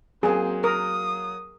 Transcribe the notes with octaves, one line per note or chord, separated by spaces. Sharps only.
F#3 A#3 C4 G#4
A#4 D#6